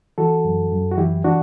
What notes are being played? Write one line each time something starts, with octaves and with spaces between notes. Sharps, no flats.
E3 F#4 A4
F#2
F#2
F#4
E3 E4 G4
E3 D4 F#4